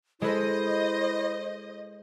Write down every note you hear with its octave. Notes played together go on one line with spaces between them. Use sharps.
G#3 E4 A4 B4 C5 D#5